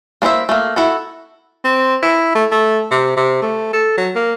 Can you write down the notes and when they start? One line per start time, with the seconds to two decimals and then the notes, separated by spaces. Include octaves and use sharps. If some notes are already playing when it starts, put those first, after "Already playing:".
0.22 A#3 D4 E4 C5 E5
0.49 A3 A#3
0.76 E4 F#4 A4
1.64 C4
2.02 E4
2.35 A3
2.52 A3
2.91 C3
3.17 C3
3.42 A3
3.73 A4
3.98 F#3
4.15 A#3